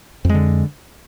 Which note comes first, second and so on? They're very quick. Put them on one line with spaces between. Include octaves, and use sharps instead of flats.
F2 G#3 D3